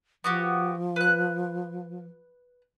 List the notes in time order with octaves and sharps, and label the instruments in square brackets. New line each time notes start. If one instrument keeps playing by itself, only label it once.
[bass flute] F3 [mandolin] B3 F#4 G4
[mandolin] B4 F#6